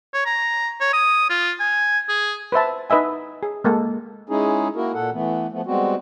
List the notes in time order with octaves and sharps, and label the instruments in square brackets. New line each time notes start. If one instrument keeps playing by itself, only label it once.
[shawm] C#5
A#5
C#5
D#6
F4
G#5
G#4
[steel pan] B4 C5 E5 A5
D#4 B4 D#5 E5 G#5
G#4
G#3 A#3 A4
[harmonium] G#3 C#4 D#4 E4 G#4
A#3 E4 F#4 A#4
A#2 A4 F#5
E3 A3 B3
F3 A3 B3
G3 G#3 B3 C4 F#4